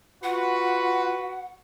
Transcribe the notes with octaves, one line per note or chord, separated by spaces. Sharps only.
F4 F#4 B4 F#5